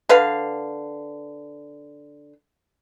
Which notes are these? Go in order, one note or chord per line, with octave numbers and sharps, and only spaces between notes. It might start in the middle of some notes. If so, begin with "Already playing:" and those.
D3 B4 F5